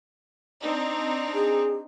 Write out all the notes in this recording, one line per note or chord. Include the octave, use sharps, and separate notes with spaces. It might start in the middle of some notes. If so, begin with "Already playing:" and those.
C4 D4 D#4
G#4